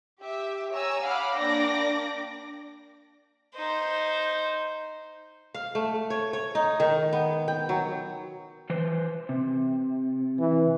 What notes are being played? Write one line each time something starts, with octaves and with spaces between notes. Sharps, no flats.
G4 E5
C#5 G#5 A#5 E6
F5 F#5 B5 D6 F6
A#3 D4 D5 G5 D6 A#6
D#4 C5
F5
A3
C#5
C#5
D#4
D#3
B3
G5
F#3
E3 B4 C5
C3
E3